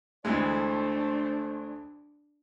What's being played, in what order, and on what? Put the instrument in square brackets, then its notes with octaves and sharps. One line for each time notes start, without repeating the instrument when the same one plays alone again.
[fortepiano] D2 E3 G#3 [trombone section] A3 C5 [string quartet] D4